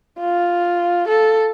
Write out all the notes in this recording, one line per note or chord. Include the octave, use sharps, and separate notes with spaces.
F4
A4